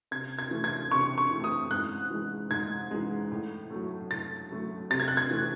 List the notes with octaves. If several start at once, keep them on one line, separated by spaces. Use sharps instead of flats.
C3 G#6
G#6
E3 A3
G#6
C3 C#6
C#6
E3 A3
D#6
G#2 F#6
E3 G#3
G#2 G#6
E3 G#3
A2
F#3 A3
A2 A6
F#3 A3
C3 A6
G#6
F#6
G#6
E3 A3